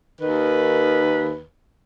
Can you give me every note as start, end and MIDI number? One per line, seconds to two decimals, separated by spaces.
0.22 1.42 39
0.22 1.42 51
0.22 1.42 71